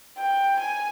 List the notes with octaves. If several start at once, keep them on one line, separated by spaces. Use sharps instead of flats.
G5
G#5